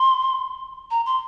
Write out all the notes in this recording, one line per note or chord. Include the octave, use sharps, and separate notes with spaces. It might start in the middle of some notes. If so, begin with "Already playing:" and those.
Already playing: C6
A#5
C6